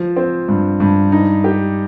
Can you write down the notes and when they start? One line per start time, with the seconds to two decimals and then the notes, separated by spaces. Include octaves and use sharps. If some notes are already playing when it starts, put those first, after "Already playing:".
Already playing: F3
0.16 C4
0.48 G2
0.80 G2
1.12 D#4
1.44 G4